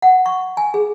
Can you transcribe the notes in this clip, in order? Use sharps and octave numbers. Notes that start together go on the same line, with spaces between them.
F#5
C#6
G#5
G#4